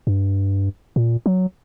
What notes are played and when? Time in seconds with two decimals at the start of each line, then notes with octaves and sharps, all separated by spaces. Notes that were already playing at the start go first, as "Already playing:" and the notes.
0.07 G2
0.96 A#2
1.26 F#3